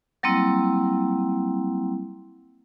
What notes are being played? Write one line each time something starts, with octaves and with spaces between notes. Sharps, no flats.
F#3 G3 A#3 C4 E4